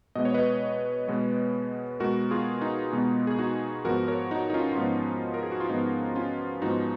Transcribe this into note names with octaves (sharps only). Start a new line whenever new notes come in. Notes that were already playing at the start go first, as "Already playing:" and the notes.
B2 G#3 B3 D#5
C#5
B4 D#5
B2 G#3 B3
B2 G#3 B3 F#4 A#4
F4 G#4
D#4
B2 G#3 B3
G#4
D#4 F#4
G#2 F3 B3 F#4 A#4
A#4 C#5
D#4 F#4
D#4
C#4 F4
F4
G#2 F3 B3 D#4
A#4
G#4
F#4
F4
G#2 F3 B3 D#4
C#4 F4
G#2 F3 B3 D#4 F#4